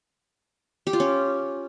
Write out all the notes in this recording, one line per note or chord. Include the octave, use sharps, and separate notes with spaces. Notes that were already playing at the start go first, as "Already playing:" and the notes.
G4
F4
C#4